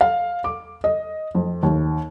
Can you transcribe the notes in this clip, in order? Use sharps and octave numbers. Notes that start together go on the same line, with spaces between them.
F5
D6
D#5
F2
D#2